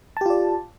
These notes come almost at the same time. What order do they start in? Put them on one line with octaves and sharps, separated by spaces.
A5 G4 F4 D5